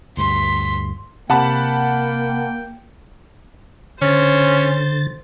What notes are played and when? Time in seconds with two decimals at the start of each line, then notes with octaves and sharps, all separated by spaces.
0.17 D2 G2 C6 B6
1.30 C3 A#3 F#5 G5 A5 B5
4.02 D3 C#4 C5 A6